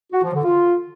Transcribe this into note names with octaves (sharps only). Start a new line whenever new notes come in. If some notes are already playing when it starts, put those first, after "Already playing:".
F#4
F3
D3
F4